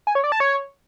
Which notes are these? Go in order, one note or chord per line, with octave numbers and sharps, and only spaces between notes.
G#5
C#5
D5
A5
C#5